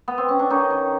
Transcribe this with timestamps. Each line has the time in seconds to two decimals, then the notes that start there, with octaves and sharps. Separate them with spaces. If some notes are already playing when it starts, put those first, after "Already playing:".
0.08 B3
0.18 C4
0.29 C#4
0.39 D4
0.50 D#3 C#4 D#4
0.71 D#3